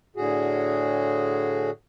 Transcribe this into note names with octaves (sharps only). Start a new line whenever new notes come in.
A2 D3 F#4 G#4